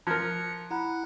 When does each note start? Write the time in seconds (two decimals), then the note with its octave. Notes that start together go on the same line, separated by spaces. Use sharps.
0.07 F3 A#4 F#6 G#6 C#7
0.71 E4 F#5 A#5 B5 F#6